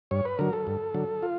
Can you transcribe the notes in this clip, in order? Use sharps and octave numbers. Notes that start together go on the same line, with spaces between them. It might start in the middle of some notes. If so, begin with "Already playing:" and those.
G2 C#5
B4
D3 F#3 A#4
A4
G2
D3 F#3
F4